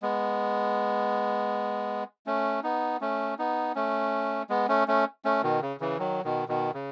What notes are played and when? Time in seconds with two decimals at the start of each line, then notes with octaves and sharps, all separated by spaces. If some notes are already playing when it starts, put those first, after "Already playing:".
0.02 G#3 B3
2.26 A3 C#4
2.63 B3 D#4
3.01 A3 C#4
3.39 B3 D#4
3.75 A3 C#4
4.50 G#3 B3
4.69 A3 C#4
4.88 A3 C#4
5.25 A3 C#4
5.43 B2 D#3
5.62 C#3
5.80 C#3 E3
5.99 D#3 F#3
6.24 B2 D#3
6.48 B2 D#3
6.74 C#3